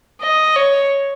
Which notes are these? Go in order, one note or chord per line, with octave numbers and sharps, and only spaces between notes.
D#5
C#5